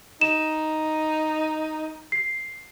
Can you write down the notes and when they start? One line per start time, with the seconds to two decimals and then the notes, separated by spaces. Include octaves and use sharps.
0.21 D#4 E7
2.12 C7